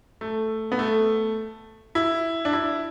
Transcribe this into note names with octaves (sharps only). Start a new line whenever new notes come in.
A3
B3
A3
E4
D4
E4